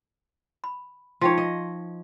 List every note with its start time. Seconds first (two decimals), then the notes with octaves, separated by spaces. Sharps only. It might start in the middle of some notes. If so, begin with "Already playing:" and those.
0.64 B5
1.21 F3 D#4 C#5 G5 C6
1.38 D#5